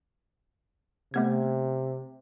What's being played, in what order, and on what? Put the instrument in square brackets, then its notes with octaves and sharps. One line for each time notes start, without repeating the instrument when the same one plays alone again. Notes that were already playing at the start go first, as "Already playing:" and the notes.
[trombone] C3 [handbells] A3 B3 G#6